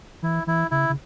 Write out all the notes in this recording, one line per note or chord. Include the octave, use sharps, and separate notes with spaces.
E3 E4
E3 E4
C#3 E4
C#3